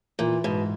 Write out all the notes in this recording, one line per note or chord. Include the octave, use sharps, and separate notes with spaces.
A#2 E3
G#2 B2